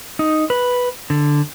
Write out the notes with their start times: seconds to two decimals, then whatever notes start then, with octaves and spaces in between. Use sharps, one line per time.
0.19 D#4
0.50 B4
1.10 D3